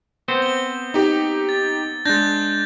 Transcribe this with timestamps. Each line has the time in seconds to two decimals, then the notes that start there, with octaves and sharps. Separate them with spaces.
0.28 B3 C4 C5
0.42 G7
0.94 D#4 G4
1.49 A6
2.06 G#3 D4 G6 A6 A#6